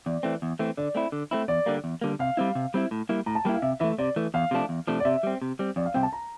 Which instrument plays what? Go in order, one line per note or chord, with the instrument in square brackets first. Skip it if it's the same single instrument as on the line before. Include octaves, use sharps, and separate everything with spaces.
[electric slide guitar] E2 [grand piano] D5
[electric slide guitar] E3 A3 C4
E2
E3 A3 C4
[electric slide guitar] D3 [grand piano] D5
[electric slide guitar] A3 C4 E4
D3
A3 C4 E4
[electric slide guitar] E2 [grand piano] D5
[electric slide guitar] D3 G3 A#3
E2
D3 G3 A#3
[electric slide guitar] C3 [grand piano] F5
[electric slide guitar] G3 C4 E4
C3
G3 C4 E4
A2
G3 A#3 E4
[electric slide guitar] A2 [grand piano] A#5
[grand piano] A5
[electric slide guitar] G3 A#3 E4 [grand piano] G5
[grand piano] F5
[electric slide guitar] C3 [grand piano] E5
[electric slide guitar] E3 A3 [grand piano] E5
[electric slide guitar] C3 [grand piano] D5
[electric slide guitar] E3 A3
[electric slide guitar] E2 [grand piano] F5
[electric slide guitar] C3 F3 A3 D4
E2
C3 F3 A3 D4
[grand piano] D5
[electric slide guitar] C3 [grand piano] E5
[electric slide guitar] G3 C4
C3
G3 C4
[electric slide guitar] F2 [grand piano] D5
[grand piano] F5
[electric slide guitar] C3 G3 C4 [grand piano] G5
[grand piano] A5
A#5